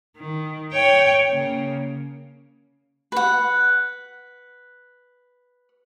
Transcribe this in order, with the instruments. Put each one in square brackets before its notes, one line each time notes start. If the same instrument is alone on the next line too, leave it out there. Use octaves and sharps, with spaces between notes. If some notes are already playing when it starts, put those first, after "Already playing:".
[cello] D#3
C#5 G5
C#3 A#3
[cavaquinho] B4 F#5